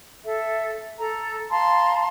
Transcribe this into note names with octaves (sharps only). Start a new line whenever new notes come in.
A4 E5
A4 A#5
F5 A5 A#5 C6